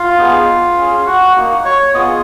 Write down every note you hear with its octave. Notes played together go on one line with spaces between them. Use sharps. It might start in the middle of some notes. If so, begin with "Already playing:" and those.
Already playing: F4 F5
B3 D#4 G#4
C#4 G#4
F#4 F#5
A#3 D#4 F#4
C#5 C#6
B3 F4 G#4 D#5 D#6